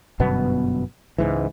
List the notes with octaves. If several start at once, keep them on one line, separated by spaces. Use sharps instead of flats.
G1 F#2 B2 B3
C#2 G#2 E3